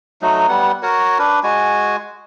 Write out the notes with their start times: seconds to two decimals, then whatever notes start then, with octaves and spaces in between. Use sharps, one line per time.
0.22 F#3 A3 D#4
0.49 G3 B3 F#5
0.83 F#4 A#4 C#5
1.19 D4 B4
1.43 G#3 F#4 G#5